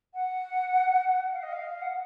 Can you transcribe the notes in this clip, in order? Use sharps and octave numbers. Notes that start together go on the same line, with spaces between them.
F#5
F5
D#5
F5
F#5